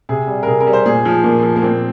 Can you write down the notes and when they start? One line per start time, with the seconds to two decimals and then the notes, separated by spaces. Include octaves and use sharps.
0.09 C3 G#4
0.27 G3
0.43 A#4
0.47 C3 G#4
0.60 A#4
0.67 G3
0.73 C5
0.86 A#2 G#4
1.05 F3
1.24 A#2 A#3
1.43 F3
1.56 A#3
1.63 A#2 C4